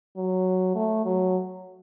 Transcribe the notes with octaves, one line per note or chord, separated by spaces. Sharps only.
F#3
A3
F#3